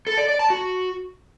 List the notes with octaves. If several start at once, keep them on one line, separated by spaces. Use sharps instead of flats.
A4
D5
D5
A5
F#4